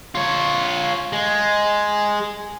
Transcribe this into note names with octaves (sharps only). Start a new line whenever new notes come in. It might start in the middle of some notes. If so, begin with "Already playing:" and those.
F4 C#5
G#3